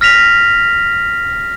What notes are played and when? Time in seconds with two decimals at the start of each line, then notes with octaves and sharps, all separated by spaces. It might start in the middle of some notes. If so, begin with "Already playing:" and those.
0.01 F6 A#6 B6 F7